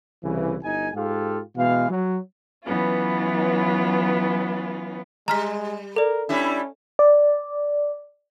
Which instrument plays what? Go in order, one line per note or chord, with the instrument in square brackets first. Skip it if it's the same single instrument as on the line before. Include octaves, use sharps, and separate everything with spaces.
[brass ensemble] C2 C#3 E3
G1 D#4 G#5
G#2 F4 G4 A4 F5
B2 E3 G#3 F5
F#3
[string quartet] E3 F#3 B3 C#4 F4
[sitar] G3 [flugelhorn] G#3 [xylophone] A#5 F6 B6
[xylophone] A4 D5 [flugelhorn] A#4
[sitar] G3 D4 E4 [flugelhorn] C#4
[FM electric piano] D5